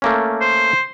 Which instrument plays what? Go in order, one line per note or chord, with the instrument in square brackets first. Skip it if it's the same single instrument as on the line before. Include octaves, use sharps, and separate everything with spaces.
[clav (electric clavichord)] A3 A#3 C#4
[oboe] C5